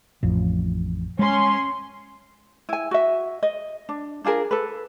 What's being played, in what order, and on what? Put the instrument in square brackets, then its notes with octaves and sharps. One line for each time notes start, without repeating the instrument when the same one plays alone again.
[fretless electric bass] A1 F2
[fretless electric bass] G#3 [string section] C#4 C6
[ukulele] E4 G#5
F#4 E5
D#5
D4
D4 F4 G#4 A#4
A4 B4